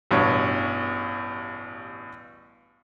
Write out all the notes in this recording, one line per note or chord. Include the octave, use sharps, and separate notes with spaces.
A1 G2 B2 C#5 C#6